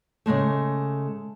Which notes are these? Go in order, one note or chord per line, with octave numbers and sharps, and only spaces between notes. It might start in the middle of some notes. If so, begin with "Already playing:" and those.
C#3 E3 G#3 A3